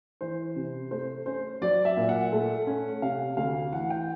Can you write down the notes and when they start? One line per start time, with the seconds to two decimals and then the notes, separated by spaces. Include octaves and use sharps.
0.21 E3 C5
0.56 C3
0.91 A3 C5
1.26 C#4 C5
1.62 F#3 D5
1.85 E5
1.97 A#2
2.09 F#5
2.32 A3
2.67 C#4
3.02 C3 F5
3.37 D2 F5
3.72 E3 F#5
3.90 G5